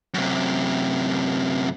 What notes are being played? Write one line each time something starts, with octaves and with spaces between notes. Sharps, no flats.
F#2 C3